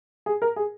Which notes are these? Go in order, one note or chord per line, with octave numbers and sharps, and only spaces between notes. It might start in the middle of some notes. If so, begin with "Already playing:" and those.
G#4
A#4
G#4